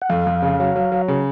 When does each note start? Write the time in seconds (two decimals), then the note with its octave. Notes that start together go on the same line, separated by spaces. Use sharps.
0.02 F#5
0.09 F2 F5
0.27 F2
0.42 C#3
0.60 F#3
0.76 F#3
0.92 F#3
1.08 C#3